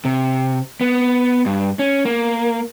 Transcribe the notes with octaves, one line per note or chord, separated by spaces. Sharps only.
C3
B3
G2
C#4
A#3